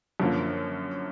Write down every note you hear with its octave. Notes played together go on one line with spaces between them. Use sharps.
F#2 D3 F3 A#3